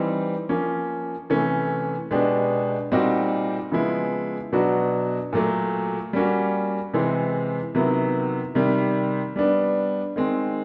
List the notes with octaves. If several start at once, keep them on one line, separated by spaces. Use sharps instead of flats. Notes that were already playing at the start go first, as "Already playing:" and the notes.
Already playing: E3 G3 C4 D#4
F3 A#3 C#4
C3 E3 A3 C#4
B2 G#3 B3 D4 G4
A#2 G3 C4 D#4 F#4
C#3 F3 G#3 B3 E4
B2 F#3 B3 D4 F#4
A#2 F#3 A3
G3 A#3 C#4 F#4
C3 E3 G#3 C4
C3 D#3 F#3 B3 E4
C3 D#3 G3
G3 B3 D4
D#3 G#3 C4